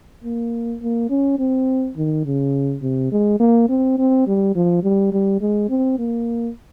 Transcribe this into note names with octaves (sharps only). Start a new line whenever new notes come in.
A#3
A#3
C#4
C4
D#3
C#3
C3
G#3
A#3
C4
C4
G3
F3
G3
G3
G#3
C4
A#3